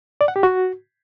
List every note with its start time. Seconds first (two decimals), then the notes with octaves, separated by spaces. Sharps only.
0.21 D5
0.28 F#5
0.36 G4
0.43 F#4